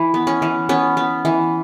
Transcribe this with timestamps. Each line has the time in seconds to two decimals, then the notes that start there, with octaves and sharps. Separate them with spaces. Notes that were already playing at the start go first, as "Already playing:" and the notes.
Already playing: E3 E4
0.14 B3
0.27 C#4
0.42 E3
0.69 B3 C#4
0.97 B3
1.25 E3